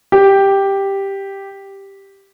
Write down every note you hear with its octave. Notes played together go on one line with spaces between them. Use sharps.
G4